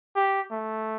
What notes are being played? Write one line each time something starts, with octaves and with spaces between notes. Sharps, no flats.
G4
A3